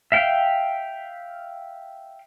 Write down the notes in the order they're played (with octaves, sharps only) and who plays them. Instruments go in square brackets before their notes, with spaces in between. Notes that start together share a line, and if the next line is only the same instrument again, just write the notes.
[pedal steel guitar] E5 F5 G5